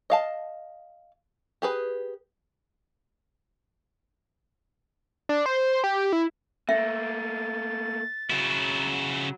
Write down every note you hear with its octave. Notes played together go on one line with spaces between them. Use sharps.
D#5 F5 A5
G4 G#4 B4
D4
C5
G4
E4
A3 A#3 E5 A6
C#3 F#3 E4